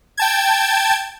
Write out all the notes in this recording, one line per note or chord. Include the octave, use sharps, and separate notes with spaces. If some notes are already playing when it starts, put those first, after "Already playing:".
G5 A5 G#6